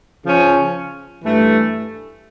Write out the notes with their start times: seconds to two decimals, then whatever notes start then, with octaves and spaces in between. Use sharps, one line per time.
0.24 C#3 F3 C#4
1.23 G2 E3 A3